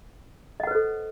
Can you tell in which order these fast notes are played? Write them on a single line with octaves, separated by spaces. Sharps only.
D#5 F#5 B4 C5 A4